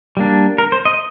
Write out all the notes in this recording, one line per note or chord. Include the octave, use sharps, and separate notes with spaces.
G3 A#3 D4
A#4
C5
D#5